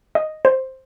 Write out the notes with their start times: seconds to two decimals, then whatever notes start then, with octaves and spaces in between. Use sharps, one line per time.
0.15 D#5
0.45 C5